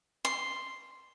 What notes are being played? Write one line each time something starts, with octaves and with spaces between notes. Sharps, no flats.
C6